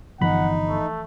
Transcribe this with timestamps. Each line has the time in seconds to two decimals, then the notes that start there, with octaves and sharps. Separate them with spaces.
0.21 G1 E3 F3 D#4 F#5 B5
0.68 A3